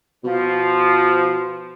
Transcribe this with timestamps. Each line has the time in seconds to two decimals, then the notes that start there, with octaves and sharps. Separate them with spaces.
0.24 B2 F3